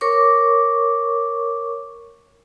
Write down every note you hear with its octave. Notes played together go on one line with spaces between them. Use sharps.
A#4 C#5 C#6 D6